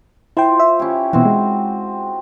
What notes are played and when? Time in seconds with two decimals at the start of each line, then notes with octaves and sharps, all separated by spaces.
0.37 E4 F4 C5 G5
0.59 E5
0.79 C#4 E4 G4
1.13 B2 E3 C4 F#4
1.25 G#3